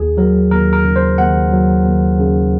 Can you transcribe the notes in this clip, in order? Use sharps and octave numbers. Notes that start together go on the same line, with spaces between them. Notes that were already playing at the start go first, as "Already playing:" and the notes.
Already playing: D#2 G#4
F#3 A#4
D#2 A#4
A#4
C#3
C5
D#2 F#5
F#3
D#2
C#3